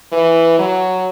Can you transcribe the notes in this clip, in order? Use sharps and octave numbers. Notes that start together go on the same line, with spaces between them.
E3
F#3